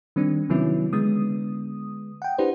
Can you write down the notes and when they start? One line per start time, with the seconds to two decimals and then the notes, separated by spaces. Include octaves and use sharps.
0.16 D#3 G3 C4 D4
0.49 C3 D#3 F#3 B3 C#4 E4
0.93 D3 G#3 B3 D#6
2.22 F#5 G5
2.38 D4 E4 G4 B4 C5